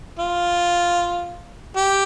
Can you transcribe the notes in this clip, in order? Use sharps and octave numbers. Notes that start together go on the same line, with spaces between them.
F4
G4